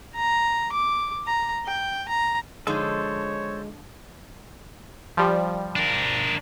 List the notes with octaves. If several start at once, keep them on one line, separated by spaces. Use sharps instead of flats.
A#5
D6
A#5
G5
A#5
D3 F3 G#3 D#4 A4 C5 C#5
F3 G3
D4 A#4